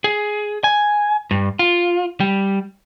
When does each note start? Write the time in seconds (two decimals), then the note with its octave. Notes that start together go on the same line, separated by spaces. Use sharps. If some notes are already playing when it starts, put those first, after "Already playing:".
0.04 G#4
0.64 G#5
1.31 G2
1.59 F4
2.20 G3